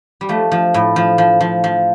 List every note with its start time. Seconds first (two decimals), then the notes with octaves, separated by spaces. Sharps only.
0.21 G3
0.29 F3 A3
0.52 F3
0.74 A2
0.96 F3
1.18 F3
1.41 F3
1.64 F3